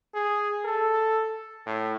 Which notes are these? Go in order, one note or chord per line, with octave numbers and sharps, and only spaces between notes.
G#4
A4
A2